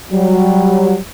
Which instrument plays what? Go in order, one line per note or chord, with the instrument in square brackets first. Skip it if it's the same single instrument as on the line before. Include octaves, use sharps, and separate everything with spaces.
[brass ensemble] F#3 G3